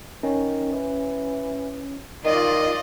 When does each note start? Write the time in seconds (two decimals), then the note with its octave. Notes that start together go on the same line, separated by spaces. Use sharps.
0.23 D#3 C#4
0.73 E3
2.25 D#3 F4 D5 D#5